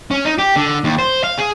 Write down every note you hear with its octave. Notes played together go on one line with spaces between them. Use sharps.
C#4
D#4
G4
D3
D#2
C5
F5
G#4